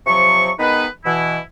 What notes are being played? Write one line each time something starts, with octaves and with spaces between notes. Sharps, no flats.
C3 F3 F#3 C#6
D#3 G#3 B3 D#4 B4
B2 E3 E4